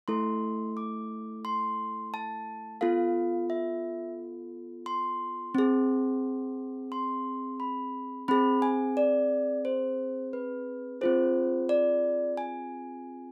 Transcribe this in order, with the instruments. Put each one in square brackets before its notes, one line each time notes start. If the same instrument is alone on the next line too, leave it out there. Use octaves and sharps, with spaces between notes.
[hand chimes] A3 E4 A4 C6
D6
C6
A5
B3 F4 A4 F5
E5
C6
C4 G#4
C6
B5
C4 G#4 B5
G#5
D5
C5
B4
C4 F4 G#4 C5
D5
G#5